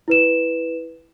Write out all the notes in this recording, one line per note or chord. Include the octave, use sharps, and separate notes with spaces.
E4 B4 E7